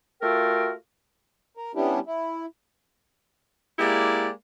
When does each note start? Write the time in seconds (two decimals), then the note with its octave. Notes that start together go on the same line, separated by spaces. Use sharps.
0.22 A3 F4 F#4 A4 A#4 G5
1.57 A#4
1.75 G3 B3 C#4 D4 E4 G4
2.06 E4
3.78 G#3 A#3 E4 G4 D5